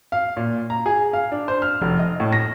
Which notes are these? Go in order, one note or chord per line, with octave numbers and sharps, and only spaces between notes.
F5
A#2
A#5
G#4
F5
D4
C5
F6
F1
D#5
A2
A#6